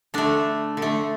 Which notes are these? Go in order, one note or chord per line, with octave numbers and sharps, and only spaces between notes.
D3 A3 D4
D3
A3